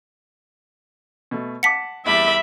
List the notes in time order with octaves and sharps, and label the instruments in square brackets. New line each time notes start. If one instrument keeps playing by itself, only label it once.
[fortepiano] B2 A3
[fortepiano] F#5 A5 D6 [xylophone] B6 C#7
[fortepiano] E2 G3 [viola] E5 [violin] B5 D6